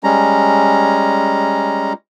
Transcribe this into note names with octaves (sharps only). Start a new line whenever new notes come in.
G3 G#3 C#4 A#5